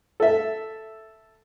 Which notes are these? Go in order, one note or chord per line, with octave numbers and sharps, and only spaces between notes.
A4 E5